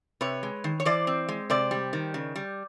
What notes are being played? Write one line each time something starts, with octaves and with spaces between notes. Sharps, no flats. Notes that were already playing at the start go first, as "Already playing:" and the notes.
C3 B4 C#5
G#3
D#3
C#5
E3 C5 D5
C4
G#3
C3 C5 D5
G3
D#3
C#3
G3